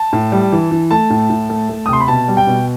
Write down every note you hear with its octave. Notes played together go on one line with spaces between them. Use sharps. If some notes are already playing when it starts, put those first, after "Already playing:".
Already playing: A5
A2
G3
E3
E3
A3 A5
A2
A2
A3
A3
D#6
C3 C6
B5
B2 A5
G3
G5
B2